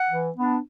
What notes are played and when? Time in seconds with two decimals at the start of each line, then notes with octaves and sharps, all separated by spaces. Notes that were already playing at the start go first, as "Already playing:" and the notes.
Already playing: F#5
0.11 E3
0.37 B3 D4